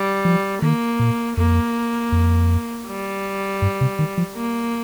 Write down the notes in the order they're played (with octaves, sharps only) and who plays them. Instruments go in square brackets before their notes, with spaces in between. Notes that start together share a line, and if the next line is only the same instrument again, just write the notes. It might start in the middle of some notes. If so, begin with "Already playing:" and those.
Already playing: [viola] G3
[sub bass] F3
[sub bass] D#3 [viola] A#3
[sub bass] A#2
[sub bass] F2 [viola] A#3
[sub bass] F2
[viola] G3
[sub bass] G2
C3
D#3
F3
[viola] A#3